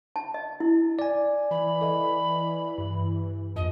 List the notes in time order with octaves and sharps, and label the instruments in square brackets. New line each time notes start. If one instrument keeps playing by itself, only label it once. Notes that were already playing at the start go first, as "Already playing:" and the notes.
[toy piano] A5
D#5
E4
[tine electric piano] D5 G#5
[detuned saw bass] E3 [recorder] B5
[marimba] A4 D#5
G2
[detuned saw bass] A#1 [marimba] F2 [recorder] D#5